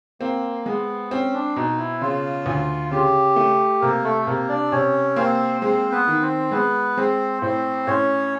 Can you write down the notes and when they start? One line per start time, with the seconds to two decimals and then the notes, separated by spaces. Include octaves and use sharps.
0.21 A#3 C4
0.66 G#3 B3
1.11 C4 C#4
1.34 D4
1.56 B2 D#4
1.78 E4
2.02 C#3 F4
2.46 D2
2.91 C#3 G4
3.36 A3
3.81 C3 A#3 A#4
4.04 A3 A4
4.22 A4
4.27 C3 A#3 A#4
4.49 D4 D5
4.72 C3 C#4 C#5
5.16 A#3 C4 C5
5.62 G#3 C4 C5
5.92 B3 B4
6.07 D#3
6.22 C4 C5
6.52 G#3 B3 B4
6.97 G#3 C4 C5
7.42 A2 C4 C5
7.87 A2 C#4 C#5